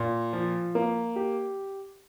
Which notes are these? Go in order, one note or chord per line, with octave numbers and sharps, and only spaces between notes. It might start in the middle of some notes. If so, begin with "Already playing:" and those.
Already playing: A#2
F3
A#3
G4